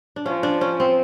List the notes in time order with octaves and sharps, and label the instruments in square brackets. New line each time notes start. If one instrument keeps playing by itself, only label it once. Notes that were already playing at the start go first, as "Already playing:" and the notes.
[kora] D4
[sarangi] F3 [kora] C#4
[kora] D4
C#4
C4